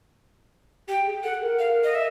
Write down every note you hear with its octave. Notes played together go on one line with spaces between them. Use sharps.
G4 G5
G#4
A4 F#5
A#4
F5
D#5
E5